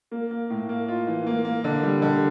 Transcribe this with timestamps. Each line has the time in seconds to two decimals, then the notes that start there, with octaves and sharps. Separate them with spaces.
0.11 A#3
0.31 A#3
0.50 A2
0.69 A#3
0.88 F4
1.07 E3
1.27 A#3
1.45 A#3
1.64 D3
1.83 G3
2.02 D3